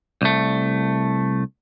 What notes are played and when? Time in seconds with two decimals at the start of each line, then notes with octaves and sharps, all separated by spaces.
0.22 C2 A3